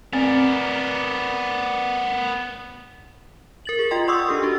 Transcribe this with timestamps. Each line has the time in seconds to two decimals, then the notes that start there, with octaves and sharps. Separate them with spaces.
0.13 B3 C4 A#4 D5
3.65 A#4 A6 F#7
3.79 G#4 A6
3.91 F4 D#5 G5 C6
4.07 D5 F#5 C6 C#6 D#6 E6
4.29 D4 G4 A4
4.43 D4 F#4